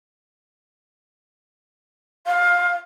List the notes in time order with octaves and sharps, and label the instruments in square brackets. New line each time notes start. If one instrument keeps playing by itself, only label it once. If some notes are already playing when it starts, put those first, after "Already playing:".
[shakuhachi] F5